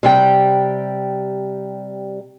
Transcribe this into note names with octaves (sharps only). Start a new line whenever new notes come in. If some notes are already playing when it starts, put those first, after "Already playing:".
C3 G3 G5